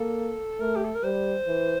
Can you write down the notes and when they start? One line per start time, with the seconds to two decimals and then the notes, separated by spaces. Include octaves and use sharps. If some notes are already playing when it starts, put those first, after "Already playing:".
Already playing: A#3 A4
0.60 A3 A#4
0.76 G4
0.85 A4
0.95 A#4
1.03 G3 C5
1.47 E3